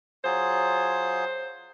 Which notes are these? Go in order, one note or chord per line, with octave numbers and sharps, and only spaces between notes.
F#3 F4 G#4 C5